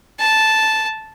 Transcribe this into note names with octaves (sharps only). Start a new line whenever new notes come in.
A5